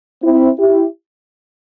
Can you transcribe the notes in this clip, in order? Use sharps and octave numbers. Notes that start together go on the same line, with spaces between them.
C4 E4
E4 G4